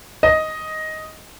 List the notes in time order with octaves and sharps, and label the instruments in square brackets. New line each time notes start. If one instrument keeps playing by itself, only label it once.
[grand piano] D#5